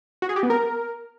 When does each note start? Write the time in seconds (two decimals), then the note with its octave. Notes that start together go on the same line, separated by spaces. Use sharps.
0.22 F#4
0.29 G#4
0.36 G4
0.43 B3
0.50 A#4